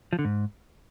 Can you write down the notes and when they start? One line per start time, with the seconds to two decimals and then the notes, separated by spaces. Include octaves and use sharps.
0.13 F3
0.19 D3
0.25 G#2